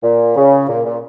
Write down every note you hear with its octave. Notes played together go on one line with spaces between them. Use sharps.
A#2
C#3
A#2
A#2